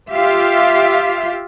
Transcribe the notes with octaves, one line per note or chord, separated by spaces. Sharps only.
F4 G4 E5 F5